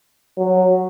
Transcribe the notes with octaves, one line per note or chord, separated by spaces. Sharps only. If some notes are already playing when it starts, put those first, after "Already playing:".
F#3